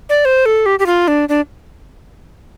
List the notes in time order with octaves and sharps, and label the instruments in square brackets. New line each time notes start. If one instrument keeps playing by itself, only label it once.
[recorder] D5
C5
A4
G4
G4
F4
D4
D4